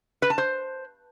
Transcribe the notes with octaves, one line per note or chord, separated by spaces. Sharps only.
B4
A5
C5